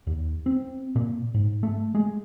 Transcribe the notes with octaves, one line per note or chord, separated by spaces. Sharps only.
D#2
C4
A#2
G#2
A3
G#3